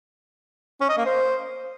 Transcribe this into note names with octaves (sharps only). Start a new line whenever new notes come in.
C#4
D#5
A#3
C5